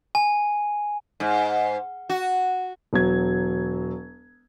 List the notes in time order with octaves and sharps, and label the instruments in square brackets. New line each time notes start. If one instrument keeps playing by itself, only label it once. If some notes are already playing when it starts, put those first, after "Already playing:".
[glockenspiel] G#5
[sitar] G#2
F#4
[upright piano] E1 F#3 G#6